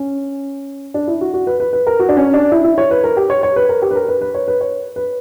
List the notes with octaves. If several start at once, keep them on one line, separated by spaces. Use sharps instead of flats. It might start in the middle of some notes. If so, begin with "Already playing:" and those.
Already playing: C#4
D4
E4
F#4
F#4
B4
B4
B4
A#4
F#4
D4
C#4
D4
E4
E4
C#5
B4
A#4
G4
C#5
C#5
B4
A#4
G4
B4
A#4
B4
B4
C#5
B4
C#5
B4